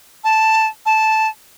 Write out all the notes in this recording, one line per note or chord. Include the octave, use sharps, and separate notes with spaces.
A5
A5